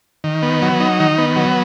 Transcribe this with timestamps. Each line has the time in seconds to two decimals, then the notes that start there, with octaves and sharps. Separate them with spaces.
0.24 D#3
0.43 B3
0.62 F#3
0.80 D#4
1.00 D#3
1.18 B3
1.36 F#3